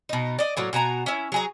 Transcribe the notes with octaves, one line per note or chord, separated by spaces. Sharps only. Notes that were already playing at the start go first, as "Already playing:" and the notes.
B2 D#4
D5 D#5
A2 F#3 A#3
B2 F#4 G#5 A#5
C#4 E4
F#3 G#4 A#5